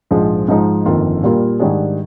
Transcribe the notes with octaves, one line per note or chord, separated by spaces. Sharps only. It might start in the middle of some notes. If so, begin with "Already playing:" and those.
A#1 G#2 F3 G#3
G#2 F3 G#3 D#4
G1 F2 D#3 A#3 F4
A#2 G3 A#3 F4
G#2 D#3 G3 D4 G#4